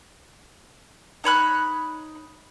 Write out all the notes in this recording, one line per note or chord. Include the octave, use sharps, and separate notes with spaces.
D#4 C#5 B5 F#6